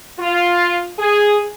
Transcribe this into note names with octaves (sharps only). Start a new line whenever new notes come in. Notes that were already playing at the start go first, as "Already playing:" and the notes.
F4
G#4